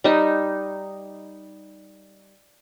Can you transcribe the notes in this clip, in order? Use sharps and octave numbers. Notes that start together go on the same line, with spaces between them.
G3 D#4